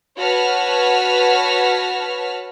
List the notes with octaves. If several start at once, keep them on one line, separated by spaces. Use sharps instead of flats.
F#4 B4 C#5 A5 F6 B6